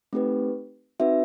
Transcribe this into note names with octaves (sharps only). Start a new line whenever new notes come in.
A3 C4 D#4 G4 B4
C4 D#4 F#4 B4 E5